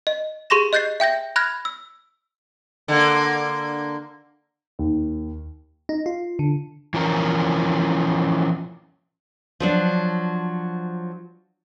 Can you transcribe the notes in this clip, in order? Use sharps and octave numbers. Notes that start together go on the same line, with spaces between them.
D#5
G4 G#4 C6 C#6 A#6 E7
D#5 F#6 G6 A6 C7
E5 G5 G6 A#6
B5 F6 F#6 G#6 A#6
E6
D3 A#3
D#2
D#4
F4
D3
E3 F3 C#4 A#4
F3 F#3 D4